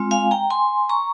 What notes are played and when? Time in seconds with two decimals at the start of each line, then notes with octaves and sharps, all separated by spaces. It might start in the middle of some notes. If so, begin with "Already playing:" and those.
Already playing: G#3 C4 F4
0.11 F5 G#5
0.31 G5 A#5
0.50 G#5 C6
0.89 A#5 C#6